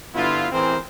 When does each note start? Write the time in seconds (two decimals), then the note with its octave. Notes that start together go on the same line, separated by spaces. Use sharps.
0.14 G2 D3 B3 E4 F4
0.52 A1 E3 C4 G#4 A#4 C5